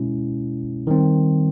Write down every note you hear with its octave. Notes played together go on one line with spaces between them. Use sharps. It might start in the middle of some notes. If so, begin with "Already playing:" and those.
Already playing: B2 G#3 C#4 E4
D#3 G3 C4